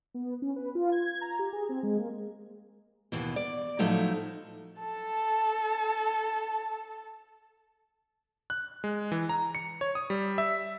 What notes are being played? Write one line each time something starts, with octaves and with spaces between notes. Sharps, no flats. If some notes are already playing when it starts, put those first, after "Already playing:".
B3
C#4
B4
F4
G#6
A#5
G4
G#4
C4
G#3
A#3
D#2 B2 E3
D5
A2 F3 F#3 A3 D#4
A4 A5
F#6
G#3
E3
A#5
C#7
C#5
D#6
G3
E5